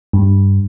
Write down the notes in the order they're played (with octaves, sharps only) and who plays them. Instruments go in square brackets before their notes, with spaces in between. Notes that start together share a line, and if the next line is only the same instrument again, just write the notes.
[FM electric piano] G2